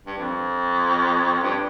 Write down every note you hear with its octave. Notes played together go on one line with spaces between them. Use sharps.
G2
F2
G2